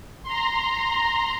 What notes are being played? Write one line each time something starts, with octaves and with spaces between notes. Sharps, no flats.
A#5 C6